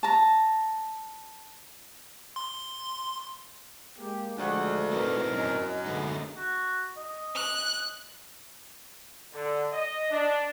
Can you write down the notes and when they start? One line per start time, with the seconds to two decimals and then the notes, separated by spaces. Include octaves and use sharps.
0.03 A5 A#5
2.36 C6
3.98 G#3 A#3 G4
4.38 D2 D#3 F3 G#3 F#5
4.93 C4 D#4 E4 F#4 A#4 B4
5.33 F#2 D#5
5.86 D3 G#3 A3 B3 D#4
6.37 F#4
6.97 D#5
7.35 F#6
9.33 D3
9.72 D#5
10.11 D4